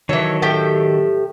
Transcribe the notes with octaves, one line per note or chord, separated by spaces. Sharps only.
D#3 E3 F#3 A4 C#5
A2 G4 G5